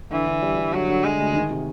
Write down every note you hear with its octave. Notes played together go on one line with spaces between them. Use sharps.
D3 E3
D3
G3
G3
D3 F#3
D3
D3 G#3
D2
D#3
C3